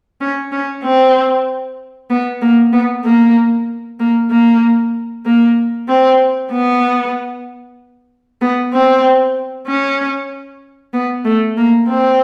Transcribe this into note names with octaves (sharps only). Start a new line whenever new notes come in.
C#4
C#4
C4
B3
A#3
B3
A#3
A#3
A#3
A#3
C4
B3
B3
C4
C#4
B3
A3
A#3
C4